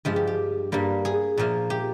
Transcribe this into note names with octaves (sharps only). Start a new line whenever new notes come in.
G2 F3 G#3 G4
G4
G4
G2 G3 A#3
G#4
A#2 F3 A#3
G4